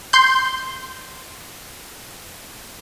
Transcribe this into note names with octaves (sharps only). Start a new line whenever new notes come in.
C6 G6